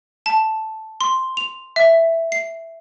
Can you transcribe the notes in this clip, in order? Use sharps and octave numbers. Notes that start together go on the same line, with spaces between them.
A5
C6
F7
E5
C7